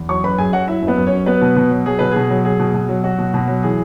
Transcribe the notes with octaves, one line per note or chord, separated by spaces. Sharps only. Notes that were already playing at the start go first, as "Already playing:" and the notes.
Already playing: E2
F#3 C#5 C#6
F#2 B4 B5
F#2 G#4 G#5
F#3 F#4 F#5
F#3 E4 E5
F#2
B3 B4
F#2
C#4 C#5
F#3
F#3 B3 B4
B2
B2
F#3
F#3 G#4
B2 B4
B2 G#4
F#3
F#3 G#4
B2
B2
F#3
F#3 F#4
B2
B2
F#3
E3 G#4